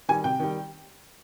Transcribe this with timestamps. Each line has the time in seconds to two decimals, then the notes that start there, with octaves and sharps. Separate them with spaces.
0.09 D#3 G3 G#5
0.24 C3 G5
0.40 D#3 G3